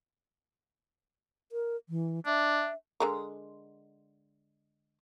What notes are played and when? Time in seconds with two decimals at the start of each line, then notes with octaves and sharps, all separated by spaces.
1.52 A#4
1.89 E3
2.26 D4 E5
3.00 D3 G#3 A#4